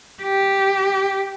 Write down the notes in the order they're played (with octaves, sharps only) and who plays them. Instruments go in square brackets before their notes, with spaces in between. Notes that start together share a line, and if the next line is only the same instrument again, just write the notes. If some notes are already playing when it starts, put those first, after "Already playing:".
[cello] G4